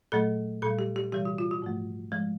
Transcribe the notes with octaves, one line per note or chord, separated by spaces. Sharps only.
A#2 F#3 A3 A4
A#2 G3 A4
G4
G4
C3 E3 G3 G4
F#4
F4
F#4
G#2 F3 A3
F3 G#3